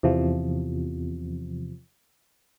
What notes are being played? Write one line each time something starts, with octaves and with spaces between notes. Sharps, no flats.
E2 C3 F3